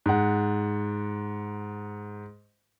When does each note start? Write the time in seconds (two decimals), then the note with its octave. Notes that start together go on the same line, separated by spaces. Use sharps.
0.06 G#2 F#5